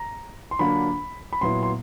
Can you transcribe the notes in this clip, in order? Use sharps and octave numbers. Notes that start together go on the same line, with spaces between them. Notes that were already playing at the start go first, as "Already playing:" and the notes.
Already playing: A#5
C6
D3 F#3 A#3 D4 F4 B5
B5
A#2 F#3 B3 E4 C6
C6